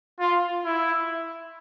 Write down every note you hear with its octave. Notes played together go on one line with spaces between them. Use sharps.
F4
E4